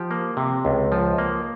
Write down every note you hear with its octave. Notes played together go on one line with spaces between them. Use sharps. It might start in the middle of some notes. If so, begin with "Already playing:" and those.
Already playing: F3 G4
A#3
C3
C#2
F3
A#3